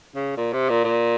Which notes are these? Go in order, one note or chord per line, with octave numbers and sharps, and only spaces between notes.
C#3
A#2
C3
A#2
A#2